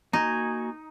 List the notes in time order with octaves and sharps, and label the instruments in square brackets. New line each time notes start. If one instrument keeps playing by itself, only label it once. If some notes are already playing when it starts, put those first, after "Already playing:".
[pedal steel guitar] A#3 F#4 G#5 [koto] D#4